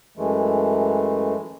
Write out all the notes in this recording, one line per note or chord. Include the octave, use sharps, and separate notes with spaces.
F#2 E3 G#3 A3